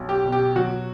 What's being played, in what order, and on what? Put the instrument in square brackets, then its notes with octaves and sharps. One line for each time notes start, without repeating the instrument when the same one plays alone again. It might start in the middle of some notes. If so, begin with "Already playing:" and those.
Already playing: [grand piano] B1
[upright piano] G4
[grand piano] B2
[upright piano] G4
[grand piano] F#3 [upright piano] F#4